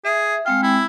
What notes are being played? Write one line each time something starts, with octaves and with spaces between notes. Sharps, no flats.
G#4 E5
G#3 C4 F5 G5
E4